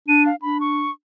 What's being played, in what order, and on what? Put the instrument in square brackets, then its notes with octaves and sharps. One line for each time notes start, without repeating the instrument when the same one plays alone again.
[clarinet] D4 [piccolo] D#7
[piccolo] F5
[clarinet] D4 [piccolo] B5
[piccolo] C#6